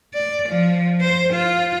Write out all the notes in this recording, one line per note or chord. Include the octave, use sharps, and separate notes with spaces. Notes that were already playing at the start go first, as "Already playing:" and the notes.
D5
F3
C5
F4